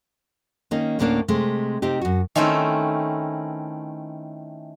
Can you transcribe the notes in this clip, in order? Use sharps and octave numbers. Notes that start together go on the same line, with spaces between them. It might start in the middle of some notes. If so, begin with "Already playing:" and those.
D#3 A#3 C#4 D#4
D2 A2 A#3 B3 C#4 D4
C3 G#3 A3
C3 C4 D#4 G4
F#2 F#4
D#3 A3 C4 C#4 E4